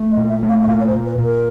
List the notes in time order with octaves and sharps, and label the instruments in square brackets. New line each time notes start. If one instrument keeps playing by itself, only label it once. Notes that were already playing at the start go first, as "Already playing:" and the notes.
Already playing: [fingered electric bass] A3
[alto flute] D#5
[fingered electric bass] A#2
[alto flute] E5
[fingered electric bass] A3
[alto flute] F5
E5
[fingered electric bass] A#2 [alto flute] F5
[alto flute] C#5
C5
[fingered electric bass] A#2
[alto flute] B4
[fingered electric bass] A#2
[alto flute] A#4